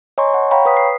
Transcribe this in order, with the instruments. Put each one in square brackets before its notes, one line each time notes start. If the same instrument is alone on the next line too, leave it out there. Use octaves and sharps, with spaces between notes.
[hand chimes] C#5 D#5 G#5 A#5 C6 C#6
F#5
C#5 F5 G5 A#5 B5 C#6
B4 D#6 B6
C7